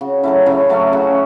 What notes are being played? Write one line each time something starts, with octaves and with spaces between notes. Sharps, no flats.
C#3 F#4
F#3 A3 C#4 E4
C#3 E4
F#3 A3 C#4 F#4
C#3 F#4